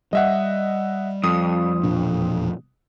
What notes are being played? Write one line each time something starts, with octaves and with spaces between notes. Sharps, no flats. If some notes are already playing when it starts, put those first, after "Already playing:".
G3 D#5 E5 F#5
F2 D#6
E1 A#2 D4